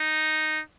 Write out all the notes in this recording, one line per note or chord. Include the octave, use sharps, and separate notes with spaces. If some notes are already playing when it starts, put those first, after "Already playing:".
Already playing: D#4